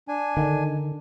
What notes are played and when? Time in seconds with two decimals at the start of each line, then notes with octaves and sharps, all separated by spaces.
0.08 D4 G#5
0.37 D3 D#3